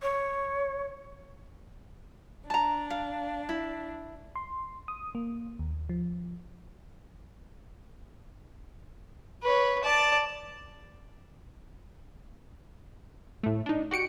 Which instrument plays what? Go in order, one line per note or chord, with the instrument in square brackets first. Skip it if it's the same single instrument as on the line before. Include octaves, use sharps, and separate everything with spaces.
[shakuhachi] C#5
[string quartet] D4 [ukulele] A5 A#5
[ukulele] F5
E4
[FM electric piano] C6
D#6
A#3
D#2
F3
[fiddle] B4 C#5
D5 A5
[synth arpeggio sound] A2 A3
D4 D#4
F#4 G4 C#7 D7